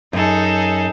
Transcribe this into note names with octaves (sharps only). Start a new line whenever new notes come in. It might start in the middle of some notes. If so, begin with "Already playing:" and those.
F#2 D#4 G#4 A4